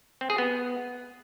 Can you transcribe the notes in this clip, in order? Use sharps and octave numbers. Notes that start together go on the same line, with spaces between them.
C4
G#4
B3